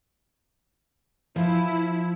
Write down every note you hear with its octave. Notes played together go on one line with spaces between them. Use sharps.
F3 E4